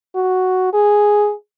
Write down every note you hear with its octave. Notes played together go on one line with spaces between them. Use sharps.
F#4
G#4